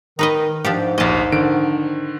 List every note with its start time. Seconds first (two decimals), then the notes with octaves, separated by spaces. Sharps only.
0.19 D#3 D#4 B4 D#5
0.65 G#2 F3 D4 G4
0.98 A#1 D#2 D#5 A5
1.32 D3 D#3 D7